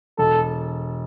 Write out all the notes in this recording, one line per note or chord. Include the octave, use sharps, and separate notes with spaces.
E1 A4